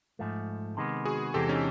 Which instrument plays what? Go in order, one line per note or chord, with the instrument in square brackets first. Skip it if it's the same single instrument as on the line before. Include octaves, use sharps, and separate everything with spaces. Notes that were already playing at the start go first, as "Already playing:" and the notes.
[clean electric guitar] G#2 F3 A3
C3 D#3 G#3 B3
[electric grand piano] F#4 G#4
[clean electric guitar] E2 C3 E3 G#3 C4 [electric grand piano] G4 A4
[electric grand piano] C#4 D#4